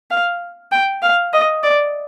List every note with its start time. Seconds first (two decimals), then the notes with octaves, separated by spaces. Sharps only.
0.11 F5
0.72 G5
1.02 F5
1.34 D#5
1.64 D5